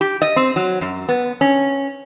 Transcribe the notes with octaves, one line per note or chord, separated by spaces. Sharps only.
G4
D#5
C4
F#3
F#2
B3
C#4